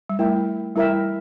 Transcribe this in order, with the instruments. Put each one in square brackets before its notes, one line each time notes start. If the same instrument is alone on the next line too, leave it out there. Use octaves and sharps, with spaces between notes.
[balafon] G3
[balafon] A3 [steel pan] E4 A#4 E5 G5
[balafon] G3 [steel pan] E4 A#4 E5 G5